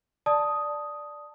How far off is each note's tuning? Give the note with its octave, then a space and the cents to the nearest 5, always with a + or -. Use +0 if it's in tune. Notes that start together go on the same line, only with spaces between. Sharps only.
D5 +0 A5 +0 D#6 +5